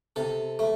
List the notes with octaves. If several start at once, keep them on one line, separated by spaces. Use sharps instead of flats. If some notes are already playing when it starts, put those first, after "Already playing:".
C3 A4
A3